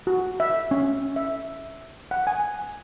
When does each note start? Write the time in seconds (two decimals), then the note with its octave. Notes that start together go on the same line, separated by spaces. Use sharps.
0.07 F#4
0.40 E5
0.71 C#4
1.16 E5
2.11 F#5
2.27 G#5